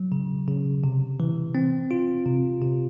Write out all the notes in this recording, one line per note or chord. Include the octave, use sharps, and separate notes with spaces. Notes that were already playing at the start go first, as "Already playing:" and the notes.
Already playing: F#3
C#3
C#3
C3
E3
C4
F4
C3
C3